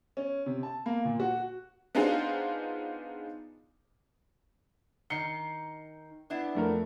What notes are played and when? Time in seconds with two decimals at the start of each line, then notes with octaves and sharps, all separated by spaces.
0.17 C#4
0.46 C3
0.63 A5
0.86 A#3
1.05 A#2
1.20 F#4
1.95 B3 D4 D#4 F4 G#4 C5
5.10 D#3 D#4 C7 C#7 G7
6.30 B3 D4 E4
6.55 F2 A3 A#4